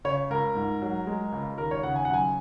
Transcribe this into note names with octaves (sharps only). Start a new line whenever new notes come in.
C#3 C#5
C#2 A#4
G#2
F#3
G#3
C#2
D#2 A#4
C#5
C#3 F#5
G#5
F#5
F#2 G#5